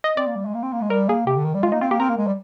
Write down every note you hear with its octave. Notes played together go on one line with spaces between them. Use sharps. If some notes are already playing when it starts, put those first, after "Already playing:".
D#5
C4 D5
A#3
G3
G#3
A#3
C4
A#3
G#3
G3 A#4
A#3 G#4
C3 G4
D3
D#3
G3
G#3 F4
A#3 D#4
C4 F4
A#3 G4
C4 A#4
A#3
G#3
G3